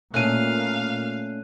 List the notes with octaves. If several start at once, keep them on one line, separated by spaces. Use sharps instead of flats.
A#2 A3 C#4 D4 F5 F#6 D#7